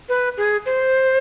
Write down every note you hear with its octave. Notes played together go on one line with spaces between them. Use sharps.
B4
G#4
C5